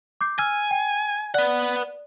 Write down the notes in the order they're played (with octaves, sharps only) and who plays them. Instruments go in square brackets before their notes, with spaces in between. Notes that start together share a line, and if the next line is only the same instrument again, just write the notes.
[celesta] D6 G6 C7
[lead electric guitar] G#5 [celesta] E6 F6
[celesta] G5
[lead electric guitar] B4 F#5 [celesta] D5